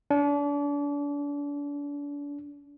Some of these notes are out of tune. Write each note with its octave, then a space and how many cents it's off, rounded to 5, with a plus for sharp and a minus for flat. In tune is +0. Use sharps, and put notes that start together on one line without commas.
D4 -35